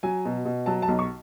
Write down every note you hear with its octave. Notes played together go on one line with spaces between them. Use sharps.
F#3 G#5
B2
B2
F#3 A5
A5
B1
C#6